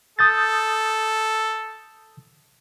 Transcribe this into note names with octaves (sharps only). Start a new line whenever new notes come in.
A4 D#6 G6 A6